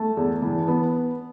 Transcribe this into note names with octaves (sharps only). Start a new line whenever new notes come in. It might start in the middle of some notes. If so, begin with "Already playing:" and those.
Already playing: A3 A5
E2
E3
B3